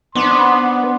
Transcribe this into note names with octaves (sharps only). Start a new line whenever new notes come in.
B3 C4 D4 C6